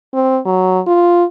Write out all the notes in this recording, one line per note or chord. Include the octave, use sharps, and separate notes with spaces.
C4
F#3
F4